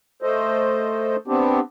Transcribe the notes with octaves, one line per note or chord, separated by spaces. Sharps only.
A3 A4 C5 D#5
B3 C4 D4 G4